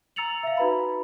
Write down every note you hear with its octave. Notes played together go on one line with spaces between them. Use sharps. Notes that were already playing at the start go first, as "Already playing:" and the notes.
A#5 E6 A6 C#7 F7 F#7
E5 F5
D#4 F#4 B4 A#5 B5